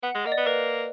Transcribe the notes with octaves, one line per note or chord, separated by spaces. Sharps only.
B3 F#5
G#3
A#3 D#5
D5
B3
A#3 B4